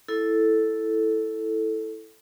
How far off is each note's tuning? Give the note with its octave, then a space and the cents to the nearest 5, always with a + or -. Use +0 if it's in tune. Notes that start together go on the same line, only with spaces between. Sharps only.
E4 +0 A4 +0